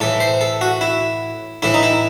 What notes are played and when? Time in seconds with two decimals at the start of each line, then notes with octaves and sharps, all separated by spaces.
0.01 A2 E3 A4
0.20 C5
0.41 A4
0.61 F#4
0.81 E4
1.62 A2 E3 E4
1.74 D#4
1.83 E4